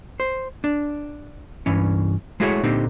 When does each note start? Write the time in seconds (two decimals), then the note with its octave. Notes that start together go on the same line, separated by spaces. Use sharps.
0.20 C5
0.64 D4
1.66 C2 G2 E3 C#4
2.40 G#3 A3 E4 F#4 G#4 C#5
2.63 A#2 D3 A#3 C4 D#4 G4